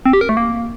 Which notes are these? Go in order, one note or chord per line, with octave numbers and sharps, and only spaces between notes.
C4
G4
A#4
A3
A#3